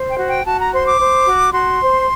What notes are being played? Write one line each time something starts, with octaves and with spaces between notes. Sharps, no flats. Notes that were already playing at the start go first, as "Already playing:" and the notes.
Already playing: C5
G5
F#4
G5
F#4 A5
A#5
C5 C6
D6
C5
F#4
F#4 C6
C5